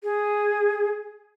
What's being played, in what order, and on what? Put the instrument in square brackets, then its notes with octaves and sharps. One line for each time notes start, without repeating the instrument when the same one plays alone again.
[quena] G#4